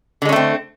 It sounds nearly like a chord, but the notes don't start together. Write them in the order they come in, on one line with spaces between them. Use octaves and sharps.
D3 G#3 C#4 A3 C4